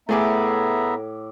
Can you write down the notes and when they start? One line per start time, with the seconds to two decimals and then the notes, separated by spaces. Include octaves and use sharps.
0.09 A2 A3 B3 G#4 E5 A#5 D6